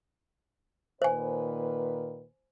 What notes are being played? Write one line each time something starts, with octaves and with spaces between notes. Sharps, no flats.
A#2 D#3 B4 C5 G#5